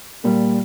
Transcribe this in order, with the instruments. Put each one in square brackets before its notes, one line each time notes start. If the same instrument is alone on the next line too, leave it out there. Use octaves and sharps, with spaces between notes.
[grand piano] A#2 G3 A#3